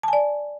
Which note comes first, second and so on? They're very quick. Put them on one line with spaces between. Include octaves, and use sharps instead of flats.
A5 G#5 D5